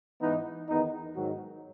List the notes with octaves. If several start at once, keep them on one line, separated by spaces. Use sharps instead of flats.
G#2 E3 B3 D#4
E2 D#3 B3 D#4
G#2 D#3 F#3